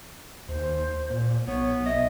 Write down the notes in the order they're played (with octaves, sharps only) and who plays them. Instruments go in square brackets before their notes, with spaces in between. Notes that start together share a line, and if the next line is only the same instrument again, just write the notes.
[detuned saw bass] D#2 [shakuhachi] C5
[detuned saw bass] A#2
[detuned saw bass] B1 [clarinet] B3 [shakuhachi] C#5
[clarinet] D#5 [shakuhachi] E5